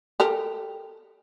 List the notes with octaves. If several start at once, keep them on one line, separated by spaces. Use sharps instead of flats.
G4 A4 A#4